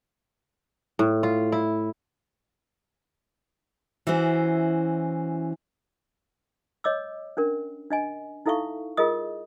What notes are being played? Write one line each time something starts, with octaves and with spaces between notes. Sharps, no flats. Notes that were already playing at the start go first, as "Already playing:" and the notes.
A2
F4
E4
E3 C#4 E4 F#4 C5
C#5 D#5 D6 E6
C#4 D4 A#4
D4 D#5 G#5
D#4 E4 A4 E5 F5 C#6
F4 G#4 A#4 D#5 D#6